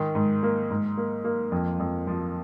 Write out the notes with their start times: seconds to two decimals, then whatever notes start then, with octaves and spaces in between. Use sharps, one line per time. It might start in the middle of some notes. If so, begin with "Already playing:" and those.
Already playing: G#2 D#3
0.15 G#2
0.43 A#3
0.70 G#2
0.97 A#3
1.24 A#3
1.52 F2
1.80 F2
2.07 F3